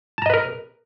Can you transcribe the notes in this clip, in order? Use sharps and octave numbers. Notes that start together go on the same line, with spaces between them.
A#4 B4 D#5 A5 A#5